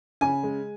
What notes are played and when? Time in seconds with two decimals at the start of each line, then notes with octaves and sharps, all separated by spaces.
0.21 C#3 G#5
0.43 G#3